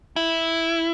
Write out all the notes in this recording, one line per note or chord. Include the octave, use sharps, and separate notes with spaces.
E4